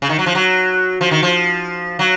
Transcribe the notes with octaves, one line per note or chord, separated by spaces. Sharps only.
C#3
D#3
F#3
F3
F#3
F3
D#3
F3
F#3